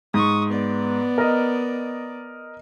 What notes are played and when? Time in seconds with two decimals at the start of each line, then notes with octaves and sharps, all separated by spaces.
0.14 G#2 C#6 D#6
0.50 B3 D5
1.18 A#4 D#5